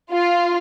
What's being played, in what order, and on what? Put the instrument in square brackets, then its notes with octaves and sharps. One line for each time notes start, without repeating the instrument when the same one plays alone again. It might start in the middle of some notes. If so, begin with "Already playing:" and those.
[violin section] F4